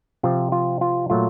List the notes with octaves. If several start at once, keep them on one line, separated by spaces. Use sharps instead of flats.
C3 F3 C4 F4
F4
F4
A#2 F#3 A3 F4